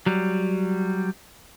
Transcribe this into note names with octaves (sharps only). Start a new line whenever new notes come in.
F#3 G3